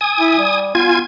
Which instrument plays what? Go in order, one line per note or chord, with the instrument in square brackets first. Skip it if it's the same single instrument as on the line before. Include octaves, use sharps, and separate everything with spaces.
[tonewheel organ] G#5 D#6
[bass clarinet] E4
G3
[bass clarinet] B3 [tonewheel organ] F4 G#5 G#6